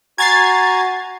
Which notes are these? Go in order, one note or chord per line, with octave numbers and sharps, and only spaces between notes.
F#4 G#5 A#5 G#6 A6 C7